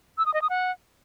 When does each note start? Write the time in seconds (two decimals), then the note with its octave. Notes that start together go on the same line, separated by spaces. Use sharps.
0.18 E6
0.26 D#6
0.34 D#5
0.42 D#6
0.50 F#5